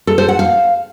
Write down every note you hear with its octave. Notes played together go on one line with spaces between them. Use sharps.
A4
C5
F#5
F5